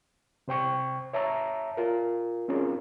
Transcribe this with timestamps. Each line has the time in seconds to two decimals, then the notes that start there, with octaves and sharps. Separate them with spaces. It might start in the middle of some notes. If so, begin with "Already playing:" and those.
0.48 C3 C5 G5 C#6
1.13 C#5 E5 A5 A#5 E6
1.77 F4 A#4
2.48 C4 C#4 D#4 F4 G#4 A#4